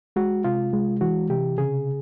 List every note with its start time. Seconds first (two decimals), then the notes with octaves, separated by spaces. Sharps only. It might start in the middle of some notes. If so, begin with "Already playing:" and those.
0.16 G#3 F#4
0.44 C3 F4
0.73 G#3
1.01 E3 F#4
1.30 C3 G4
1.58 C#3 G#4